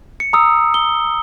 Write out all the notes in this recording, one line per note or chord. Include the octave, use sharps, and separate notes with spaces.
C#7
A#5 D#6 E6
G7